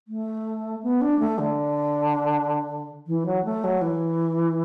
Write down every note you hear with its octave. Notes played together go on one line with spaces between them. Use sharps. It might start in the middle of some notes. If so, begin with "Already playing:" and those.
A3
B3
D4
A3
D3
E3
F#3
A3
F#3
E3